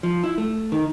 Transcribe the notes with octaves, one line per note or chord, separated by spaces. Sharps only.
F3
E4
A3
D#3